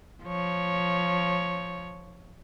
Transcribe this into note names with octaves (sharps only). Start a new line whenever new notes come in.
F3 C#5